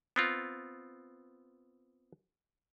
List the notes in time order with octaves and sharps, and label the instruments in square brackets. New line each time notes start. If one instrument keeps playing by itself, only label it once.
[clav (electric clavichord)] B3 C4 F4